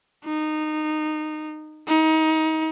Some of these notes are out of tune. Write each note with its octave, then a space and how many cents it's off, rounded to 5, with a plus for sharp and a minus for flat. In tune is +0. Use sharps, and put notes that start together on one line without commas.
D#4 -20
D#4 +25